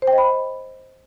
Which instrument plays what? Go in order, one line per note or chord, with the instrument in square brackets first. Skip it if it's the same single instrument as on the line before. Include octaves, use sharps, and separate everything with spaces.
[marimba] C5
G5
D#5
B5